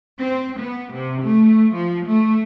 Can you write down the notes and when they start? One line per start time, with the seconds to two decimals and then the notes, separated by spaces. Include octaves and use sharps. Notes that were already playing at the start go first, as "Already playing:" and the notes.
0.21 C4
0.60 B3
0.94 C3
1.23 A3
1.75 F3
2.07 A3